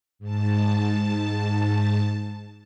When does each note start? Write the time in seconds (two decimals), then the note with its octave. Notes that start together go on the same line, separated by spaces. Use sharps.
0.19 G#2 A5